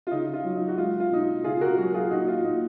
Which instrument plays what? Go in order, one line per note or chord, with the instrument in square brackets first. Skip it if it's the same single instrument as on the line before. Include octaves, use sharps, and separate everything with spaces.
[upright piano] F4
C#3 D#4
F4
F#3
D#4
F#4
G#3 F4
F4
B2 D#4
F4
C#3 F4 G#4
F#4 A#4
F#3 F#4 A#4
F4 G#4
A#2 D#4 F#4
F4
A#2 D#4